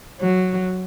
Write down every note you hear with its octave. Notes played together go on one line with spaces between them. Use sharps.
F#3